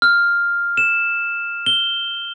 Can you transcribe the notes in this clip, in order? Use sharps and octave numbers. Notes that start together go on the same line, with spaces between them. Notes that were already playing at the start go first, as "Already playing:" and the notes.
F6
E7
G7